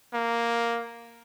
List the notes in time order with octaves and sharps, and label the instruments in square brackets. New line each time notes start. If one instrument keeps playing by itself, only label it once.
[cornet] A#3